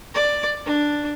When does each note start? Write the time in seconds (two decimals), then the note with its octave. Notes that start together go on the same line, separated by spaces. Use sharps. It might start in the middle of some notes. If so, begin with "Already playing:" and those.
0.15 D5
0.65 D4